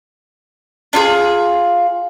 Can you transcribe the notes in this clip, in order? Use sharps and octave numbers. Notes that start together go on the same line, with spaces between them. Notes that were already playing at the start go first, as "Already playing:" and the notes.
D4 F4 G#4